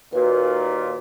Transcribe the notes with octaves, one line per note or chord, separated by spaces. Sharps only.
D#2 A#2 F#4 B4